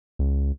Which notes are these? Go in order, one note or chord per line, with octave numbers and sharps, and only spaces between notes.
C#2